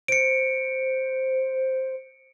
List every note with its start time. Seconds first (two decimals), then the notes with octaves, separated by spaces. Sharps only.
0.08 C5 C#7 D7